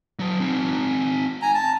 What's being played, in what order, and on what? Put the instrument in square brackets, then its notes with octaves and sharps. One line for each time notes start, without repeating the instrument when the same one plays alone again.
[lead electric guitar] F#3 A5
C4 D#4
[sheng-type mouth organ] G#5 A#5
A5